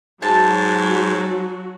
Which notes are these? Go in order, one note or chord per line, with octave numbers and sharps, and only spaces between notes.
G#2 F#3 F#4 A5